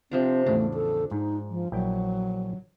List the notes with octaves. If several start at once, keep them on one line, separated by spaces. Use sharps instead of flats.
C3 F3 C4 D4
E2 A2 C#3 A3 D4
A4
G#2 D#4
F3
A#1 F#3 E4 G5